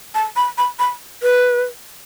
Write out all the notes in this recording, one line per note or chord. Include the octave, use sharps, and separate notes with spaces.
A5
B5
B5
B5
B4